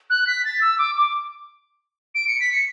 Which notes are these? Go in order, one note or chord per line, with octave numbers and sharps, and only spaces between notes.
F#6
B6
A6
E6
D6
D6
D7
C#7
B6
C#7